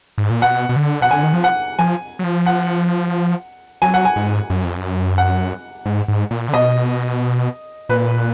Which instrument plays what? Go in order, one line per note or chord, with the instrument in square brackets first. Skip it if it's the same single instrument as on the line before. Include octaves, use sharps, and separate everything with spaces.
[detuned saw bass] G#2
A#2
[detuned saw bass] B2 [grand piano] F#5
[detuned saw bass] B2
D3
[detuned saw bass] B2 [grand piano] F#5
[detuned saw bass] D3 [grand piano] G#5
[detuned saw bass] D#3
F3
[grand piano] F#5
[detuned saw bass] F3 [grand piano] G#5
[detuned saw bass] F#3
F3
[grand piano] F#5
[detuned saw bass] F#3 [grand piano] G#5
[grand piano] F#5
G#5
[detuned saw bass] G#2
F#2
F2
F#2
[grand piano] F#5
[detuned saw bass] G#2
G#2
A#2
D3
[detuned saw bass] B2 [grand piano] D#5
[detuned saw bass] A#2 [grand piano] B4